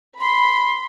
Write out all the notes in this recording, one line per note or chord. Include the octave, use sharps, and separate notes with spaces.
B5 C6